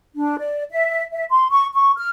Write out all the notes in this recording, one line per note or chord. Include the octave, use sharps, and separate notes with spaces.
D4
D5
E5
E5
C6
C#6
C#6
F6